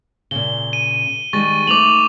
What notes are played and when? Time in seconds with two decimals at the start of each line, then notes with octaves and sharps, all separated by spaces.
0.31 A#2 C#3 G7
0.73 D#7
1.33 D#3 G3 G#3 C#6 A6
1.67 A3 D#4 C5 D6 F7 F#7